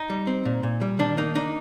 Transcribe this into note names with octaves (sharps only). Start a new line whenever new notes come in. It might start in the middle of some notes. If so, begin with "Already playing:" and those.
Already playing: D#4
G3
C4
A#2
A#2
G3
D#3 D4
A#3 D#4
D4 D#4